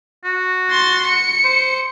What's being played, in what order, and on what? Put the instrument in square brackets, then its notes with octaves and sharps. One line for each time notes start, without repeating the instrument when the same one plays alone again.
[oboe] F#4
[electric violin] C6 A6
C#7
[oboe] C5